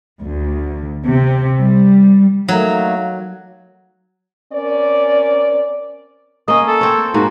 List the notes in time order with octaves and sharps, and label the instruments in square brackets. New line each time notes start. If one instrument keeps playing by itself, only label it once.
[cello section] D2
C3
G3
[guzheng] F#3 [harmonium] A3 A#3 D#4
[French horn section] C4 C#4 A#4 D5
[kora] A#3 C#4 [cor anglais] D#5
[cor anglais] A4
[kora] C4 C#5
[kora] G#2 A#3 [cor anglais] F#4